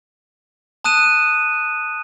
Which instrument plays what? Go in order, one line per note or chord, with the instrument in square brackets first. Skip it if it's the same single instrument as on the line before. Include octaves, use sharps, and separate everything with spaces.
[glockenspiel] A5 D#6 F#6 D#7 E7